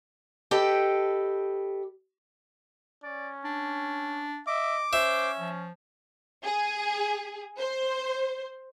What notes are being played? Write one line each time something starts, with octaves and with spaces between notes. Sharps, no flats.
G4 A4 B4 D#5 G5
C#4 D5
D4
D#5 E5 D6
C#4 C5 E5
F3
G#4
C5